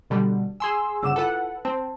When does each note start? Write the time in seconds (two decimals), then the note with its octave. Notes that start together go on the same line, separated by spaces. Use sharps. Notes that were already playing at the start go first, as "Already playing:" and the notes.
0.10 B2 D3 G3
0.60 G#4 G#5 C6 E6
1.03 G1 C#3 F#5 D6 E6 E7
1.16 E4 F4 A4 B4 F#5
1.65 C4 A5